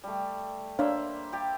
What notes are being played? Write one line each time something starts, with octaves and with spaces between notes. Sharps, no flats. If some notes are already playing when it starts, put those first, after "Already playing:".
G3 A3
A#3 D4 C5 C#5 E5 F5
G4 D5